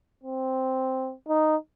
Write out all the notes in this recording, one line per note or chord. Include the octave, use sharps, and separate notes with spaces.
C4
D#4